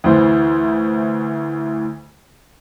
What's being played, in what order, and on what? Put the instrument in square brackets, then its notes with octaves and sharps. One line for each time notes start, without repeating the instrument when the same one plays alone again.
[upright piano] D2 E3 C5